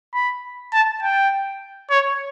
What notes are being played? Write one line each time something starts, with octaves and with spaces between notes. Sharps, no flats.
B5
A5
G5
C#5